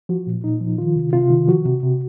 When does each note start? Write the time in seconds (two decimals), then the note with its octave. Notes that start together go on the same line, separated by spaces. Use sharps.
0.09 F3 F#4
0.27 A#2
0.44 A#2 D#4
0.61 F3
0.78 D#3 F4
0.96 C3
1.13 C3 F4
1.30 D#3
1.48 F3 F#4
1.65 C3
1.83 C3